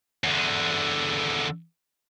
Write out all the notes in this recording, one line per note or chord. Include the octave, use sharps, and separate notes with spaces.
E2 D3